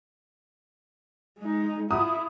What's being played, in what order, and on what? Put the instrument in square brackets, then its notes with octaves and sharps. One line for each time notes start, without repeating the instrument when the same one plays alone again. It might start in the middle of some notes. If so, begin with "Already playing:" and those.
[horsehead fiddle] G#3 D#4
[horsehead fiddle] E4 F4 [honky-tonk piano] D#6